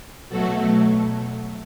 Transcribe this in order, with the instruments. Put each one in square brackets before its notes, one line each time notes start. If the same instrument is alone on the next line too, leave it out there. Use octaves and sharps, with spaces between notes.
[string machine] B2 F#3 A3 F#4 A4